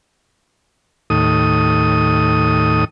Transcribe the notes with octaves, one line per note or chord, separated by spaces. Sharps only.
D#2 A2 D#6